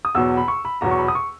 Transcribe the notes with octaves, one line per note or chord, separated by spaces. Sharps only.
D#6
E2 B2 F#3 E6
B5
C#6
B5
E2 B2 F#3 A#5
C#6
B5
D#6
C#6